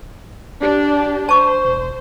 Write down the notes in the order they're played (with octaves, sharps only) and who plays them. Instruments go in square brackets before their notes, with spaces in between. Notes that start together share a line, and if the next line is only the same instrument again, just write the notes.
[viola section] D4 G4
[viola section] C5 [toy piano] A5 C#6
[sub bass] E1